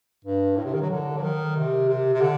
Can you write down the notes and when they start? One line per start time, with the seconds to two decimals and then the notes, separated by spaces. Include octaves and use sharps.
0.25 G2
0.57 A2
0.65 C3
0.74 D#3
0.82 F#3
0.90 D3
1.17 F#3
1.23 D#3
1.56 C3
1.89 C3
2.14 C3
2.22 D3